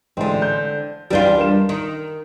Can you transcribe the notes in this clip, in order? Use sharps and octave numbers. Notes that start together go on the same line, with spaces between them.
A1 D3 G#3 C4 C6
G6
C#2 E3 G3 D4 F4 G7
A#4 E7
D#3